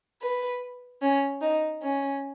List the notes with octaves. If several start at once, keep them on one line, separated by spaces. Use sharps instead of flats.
B4
C#4
D#4
C#4